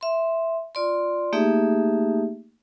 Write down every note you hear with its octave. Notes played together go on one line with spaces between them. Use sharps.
E5 C6
F4 D5 C6
A3 A#3 D#4 G4 G#4 E5